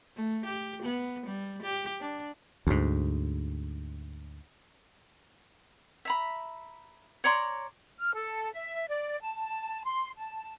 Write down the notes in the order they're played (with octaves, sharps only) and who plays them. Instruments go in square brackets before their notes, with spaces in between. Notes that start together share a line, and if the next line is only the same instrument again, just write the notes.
[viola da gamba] A3
G4
B3
G3
G4
D4
[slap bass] D2 G#2
[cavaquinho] E5 A#5 B5
C#5 D5 A#5 C6
[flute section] F6
A4
E5
D5
A5
C6
A5